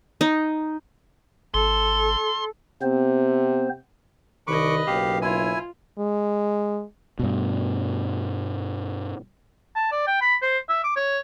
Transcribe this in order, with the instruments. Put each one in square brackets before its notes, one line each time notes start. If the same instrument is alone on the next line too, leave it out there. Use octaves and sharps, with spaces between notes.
[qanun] D#4
[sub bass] G#1 [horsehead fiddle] A4 [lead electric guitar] C6
[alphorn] C3 [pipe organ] B3 C4 C5
[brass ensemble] C2 D#3 [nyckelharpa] B4 D#5 [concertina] C#6 D6
[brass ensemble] F#1 B1 [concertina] G4 F5
[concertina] E4 G#5 [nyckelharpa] F4
[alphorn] G#3
[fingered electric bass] G2 B2
[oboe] A5
D5
G5
B5
C5
E5
D6
C#5